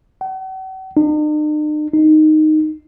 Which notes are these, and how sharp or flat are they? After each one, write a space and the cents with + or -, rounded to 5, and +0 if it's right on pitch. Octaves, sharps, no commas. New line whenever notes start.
F#5 +45
D#4 -45
D#4 -5